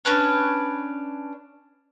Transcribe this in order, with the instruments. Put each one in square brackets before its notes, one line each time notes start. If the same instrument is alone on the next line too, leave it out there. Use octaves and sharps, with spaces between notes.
[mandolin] C#4 D4 B4 C#5